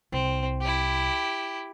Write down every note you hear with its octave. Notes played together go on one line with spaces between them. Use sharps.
C2 C4
E4 G4